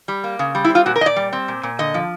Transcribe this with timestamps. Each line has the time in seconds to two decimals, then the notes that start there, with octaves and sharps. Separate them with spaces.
0.08 G3
0.24 A#3
0.39 C#3
0.55 G3
0.64 E4
0.70 C4 F4
0.86 A#2 F#4
0.96 A#4
1.01 A#2 D#5
1.06 D5
1.16 G3
1.33 C4
1.48 A#2
1.63 A#2
1.79 D3 D#5
1.94 F3